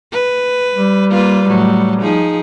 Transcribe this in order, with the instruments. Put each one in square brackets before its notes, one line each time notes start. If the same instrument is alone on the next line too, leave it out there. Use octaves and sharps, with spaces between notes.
[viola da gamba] B4
[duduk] G3
[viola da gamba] A#3 F4 B4
A2 F#3
F3 D#4 G#4